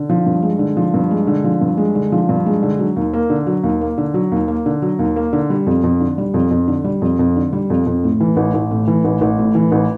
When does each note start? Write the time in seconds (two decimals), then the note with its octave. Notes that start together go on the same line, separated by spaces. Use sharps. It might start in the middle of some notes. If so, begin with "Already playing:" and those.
Already playing: D3
0.09 F3
0.26 G2
0.42 G#3
0.59 D3
0.77 F3
0.94 G2
1.11 G#3
1.27 D3
1.44 F3
1.61 G2
1.77 G#3
1.95 D3
2.12 F3
2.29 G2
2.46 G#3
2.63 D3
2.79 F#3
2.96 D#2
3.13 A#3
3.30 D3
3.47 F#3
3.63 D#2
3.81 A#3
3.98 D3
4.14 F#3
4.32 D#2
4.48 A#3
4.66 D3
4.82 F#3
4.99 D#2
5.16 A#3
5.33 D3
5.50 G3
5.67 F2
5.84 F2
6.00 D3
6.18 G3
6.34 F2
6.51 F2
6.68 D3
6.84 G3
7.02 F2
7.19 F2
7.36 D3
7.53 G3
7.70 F2
7.86 F2
8.04 A2
8.20 E3
8.36 A1
8.54 A1
8.71 A2
8.88 E3
9.04 A1
9.21 A1
9.39 A2
9.55 E3
9.72 A1